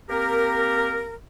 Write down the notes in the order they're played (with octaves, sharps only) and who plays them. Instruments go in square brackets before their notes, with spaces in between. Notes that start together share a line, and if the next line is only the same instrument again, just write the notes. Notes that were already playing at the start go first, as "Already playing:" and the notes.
[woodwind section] A#3 C4 G4 A#4